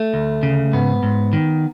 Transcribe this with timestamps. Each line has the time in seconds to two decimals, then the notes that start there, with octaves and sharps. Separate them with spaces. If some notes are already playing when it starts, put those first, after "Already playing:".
Already playing: A3
0.14 D2
0.43 C#3
0.73 G#2 B3
1.03 G#2
1.33 D#3